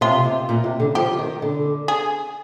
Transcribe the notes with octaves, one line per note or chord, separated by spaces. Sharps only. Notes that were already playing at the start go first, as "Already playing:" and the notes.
C3 F4
C3
A#2
C3
D3
F3 G4
D#3
D3
G#4